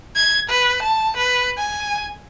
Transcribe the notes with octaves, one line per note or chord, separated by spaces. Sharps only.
G#6
B4
A5
B4
G#5